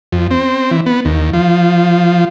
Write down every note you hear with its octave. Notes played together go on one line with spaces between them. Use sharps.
F2
C4
E3
B3
D#2
F3